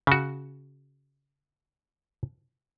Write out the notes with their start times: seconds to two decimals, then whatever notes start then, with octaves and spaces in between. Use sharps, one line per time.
0.07 C#3 F#4